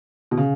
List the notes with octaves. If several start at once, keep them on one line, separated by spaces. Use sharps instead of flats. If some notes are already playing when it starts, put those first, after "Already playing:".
B2
C#3